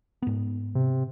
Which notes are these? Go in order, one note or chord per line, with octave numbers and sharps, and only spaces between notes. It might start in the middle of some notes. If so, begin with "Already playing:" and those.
G#2 B3
C3